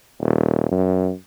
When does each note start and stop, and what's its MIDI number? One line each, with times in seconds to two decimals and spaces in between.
0.21 0.68 27
0.71 1.12 42